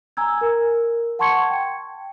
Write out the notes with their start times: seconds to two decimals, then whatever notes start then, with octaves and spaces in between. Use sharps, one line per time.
0.17 G#5 A#5 E6 G#6
0.41 A#4
1.19 F#5 A5 C6 C#6 G#6 C#7
1.51 G5